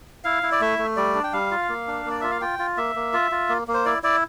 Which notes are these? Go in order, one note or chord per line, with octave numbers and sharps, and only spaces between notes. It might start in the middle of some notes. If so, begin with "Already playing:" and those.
E4 F5
E4
D5
A3 E5
A3
G3 D5
D4
G5
G3 F5
F4
A#3
D4
A#3
D5
F4 E5
F5
F4 G5
F4
A#3 E5
A#3
F4
F4
A#3
A#3
C5
E4 D5
E4 D5